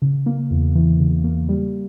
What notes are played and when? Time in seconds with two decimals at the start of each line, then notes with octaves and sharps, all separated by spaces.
0.02 C#3
0.26 A#3
0.51 E2
0.75 E3
1.00 C#3
1.24 A#3
1.49 G3